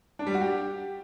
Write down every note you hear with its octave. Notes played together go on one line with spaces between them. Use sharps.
D4
G3
F#4
G4